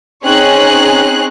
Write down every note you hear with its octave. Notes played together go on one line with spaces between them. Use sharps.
C4 C#4 D#4 G#4 C#5 F#6